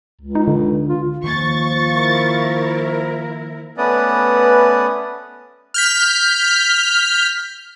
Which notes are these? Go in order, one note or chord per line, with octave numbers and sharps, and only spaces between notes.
C#2
D#4
D3
F4
D#3 F3 A#3 C#6 A6
E4 A#4
A3 B3 C#4 B4 D5 D#6
F6 G6 B6